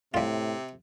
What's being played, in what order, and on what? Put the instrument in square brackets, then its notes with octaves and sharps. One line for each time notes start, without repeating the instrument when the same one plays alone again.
[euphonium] A2 [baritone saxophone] C3 [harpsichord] G3 F4